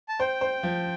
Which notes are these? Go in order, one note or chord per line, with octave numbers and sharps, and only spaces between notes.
A5
C5 G5
C5
F3